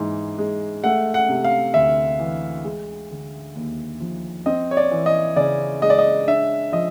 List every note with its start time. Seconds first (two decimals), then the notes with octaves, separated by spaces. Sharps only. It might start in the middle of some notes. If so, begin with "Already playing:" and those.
Already playing: G#2 E3
0.38 G#3
0.84 A3 F#5
1.14 F#5
1.29 C3
1.44 F5
1.74 D2 E5
2.19 E3
2.64 G#3
3.11 D3
3.55 D#2
4.00 F3
4.46 C4 D#5
4.71 C#5
4.77 D5
4.91 E3
5.06 D#5
5.36 C#3 D5
5.82 G#3 D#5
5.90 D5
5.99 D#5
6.27 D4 E5
6.72 F3 D#5